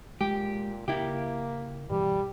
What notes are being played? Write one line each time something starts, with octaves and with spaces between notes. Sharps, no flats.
A#2 G#3 G4
C#3 A#3 E4 G4
G2 B2 E3 G3